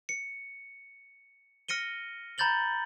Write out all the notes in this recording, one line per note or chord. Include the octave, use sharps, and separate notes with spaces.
C#7
F6 A#6 C#7 D#7 G7
A#5 B5 G6 A6 F#7 G7